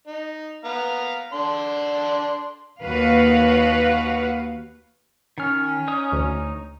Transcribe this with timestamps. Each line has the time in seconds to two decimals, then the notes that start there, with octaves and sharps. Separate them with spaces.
0.07 D#4
0.65 B3 F5 A#5
1.33 D3 D4 C6
2.81 D#2 F#4 B4 F5
5.38 D#3 C#4 F6
5.88 D#4 C#5 D#6
6.12 D2